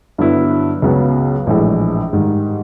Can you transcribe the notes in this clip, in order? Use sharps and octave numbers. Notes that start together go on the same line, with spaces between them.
G2 D3 F#3 B3 E4
C#2 C#3 F#3 B3
A#1 A2 E3 G#3
G#2 D#3 G3